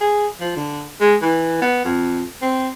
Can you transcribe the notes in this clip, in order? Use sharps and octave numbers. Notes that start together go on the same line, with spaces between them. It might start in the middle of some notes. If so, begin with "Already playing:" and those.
G#4
F3
D3
G#3
E3
B3
F2
C4